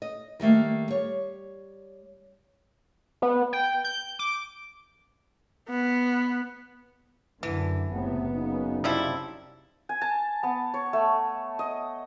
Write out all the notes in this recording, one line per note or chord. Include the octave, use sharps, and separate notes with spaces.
D#5
D#3 G3 A3 A#3
G3 C#5
B3
G5
G6
D6
B3
F#2 D3 E3
F#1 A2 C3 B3
F#2 C#3 D#4
C3 F3 G3 E4
G#5
A5
B3
C#5
A3
D#5